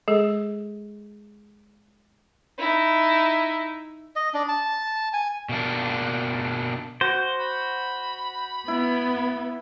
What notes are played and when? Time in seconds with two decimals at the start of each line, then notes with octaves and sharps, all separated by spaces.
0.08 G#3 G#4 A4
2.59 D#4 E4
4.16 D#5
4.34 D4
4.49 A5
5.13 G#5
5.49 B2 A#3 D4
7.01 F#4 C5
7.40 B5
8.68 B3 E4